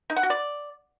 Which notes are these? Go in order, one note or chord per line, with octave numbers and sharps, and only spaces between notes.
D#4
F#5
F#4
D5